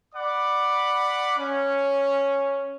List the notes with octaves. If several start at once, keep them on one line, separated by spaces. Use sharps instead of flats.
D5 F#5 B5 D6
C#4